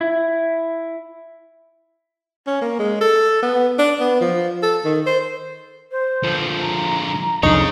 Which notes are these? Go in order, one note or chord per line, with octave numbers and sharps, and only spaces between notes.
E4
C#4
A#3
G#3
A4
B3
D4
B3
F3
A4
D#3
C5
C5
D3 F3
A#5
C2 F2 D4 D#4 G#4 C#5